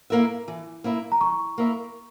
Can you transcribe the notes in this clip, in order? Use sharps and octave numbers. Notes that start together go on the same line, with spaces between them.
A#3 E4 A#4 E5
E3
A#3 E4 A#4 E5
A#5
E3 C#6
A#3 E4 A#4 E5